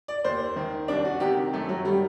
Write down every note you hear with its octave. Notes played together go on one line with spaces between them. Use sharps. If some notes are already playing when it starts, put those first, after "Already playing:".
D5
D#2 C5
D#3
C2 D4
F#4
C3 D#3 G4
F#2 A3
F#3
D#3 G3